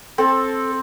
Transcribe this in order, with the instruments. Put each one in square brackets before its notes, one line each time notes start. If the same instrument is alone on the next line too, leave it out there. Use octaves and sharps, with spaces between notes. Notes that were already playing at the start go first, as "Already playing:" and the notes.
[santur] C4 [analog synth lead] A4